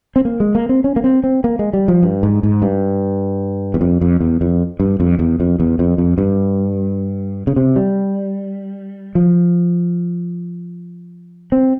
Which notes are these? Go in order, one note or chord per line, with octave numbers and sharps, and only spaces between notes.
C4
A#3
G#3
A#3
C4
C#4
A#3
C4
C4
A#3
G#3
G3
F3
G2
G#2
G#2
G2
E2
F2
F2
E2
F2
G2
F2
E2
F2
E2
F2
F2
G2
C#3
C3
G3
F3
C4